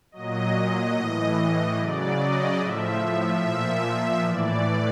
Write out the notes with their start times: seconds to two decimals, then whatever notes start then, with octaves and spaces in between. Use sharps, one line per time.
0.12 A#2 F#3 D#5
0.95 A2 E3
1.77 C#3 F#3 D5
2.17 D#5
2.59 A2 F3 E5
3.42 A#2 F3 E5
4.23 A2 E3 D5